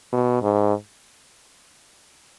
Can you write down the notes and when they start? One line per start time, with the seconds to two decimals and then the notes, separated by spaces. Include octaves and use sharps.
0.13 B2
0.42 G#2